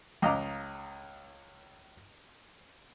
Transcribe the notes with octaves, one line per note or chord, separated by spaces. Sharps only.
C#2 D#5 F5 A#5 D6